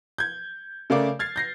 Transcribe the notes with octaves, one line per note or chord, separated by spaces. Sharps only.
G6 G#6
C#3 A3 A#4 D5 F5 D6
F6 G#6 A6 C7
G6 A#6 C7